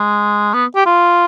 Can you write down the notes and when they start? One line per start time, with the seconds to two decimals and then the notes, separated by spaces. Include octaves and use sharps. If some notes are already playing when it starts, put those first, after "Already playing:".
Already playing: G#3
0.54 B3
0.75 G4
0.86 F4